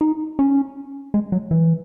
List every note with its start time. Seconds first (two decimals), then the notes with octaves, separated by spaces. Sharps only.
0.01 D#4
0.39 C#4
1.14 G#3
1.32 F#3
1.51 E3